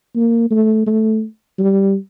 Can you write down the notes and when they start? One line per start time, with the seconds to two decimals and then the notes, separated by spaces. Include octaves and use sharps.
0.15 A#3
0.51 A3
0.87 A3
1.59 G3